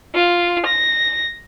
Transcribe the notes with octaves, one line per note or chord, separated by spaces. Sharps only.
F4
A#6